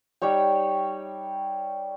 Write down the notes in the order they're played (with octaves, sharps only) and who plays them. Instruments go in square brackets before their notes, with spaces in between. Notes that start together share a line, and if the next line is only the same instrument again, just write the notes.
[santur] G3 D#4 C#5 G5